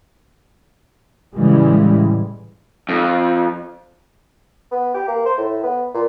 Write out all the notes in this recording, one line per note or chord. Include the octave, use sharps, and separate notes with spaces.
A2 C#3 E3 G3 G#3
F2
B3
G4
A#3
C5
A2
B3
A#2